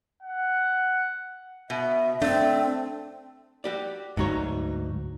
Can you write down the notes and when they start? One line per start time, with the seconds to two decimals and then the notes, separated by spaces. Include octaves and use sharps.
0.23 F#5
1.70 B2 E5
2.22 A3 C4 D4
3.64 F#4 G4 D5
4.17 D2 G#2 F#3 D#4 C#5